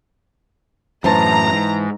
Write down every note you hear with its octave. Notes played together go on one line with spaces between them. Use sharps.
F#2 A2 E3 C5 A5 A#5
G#2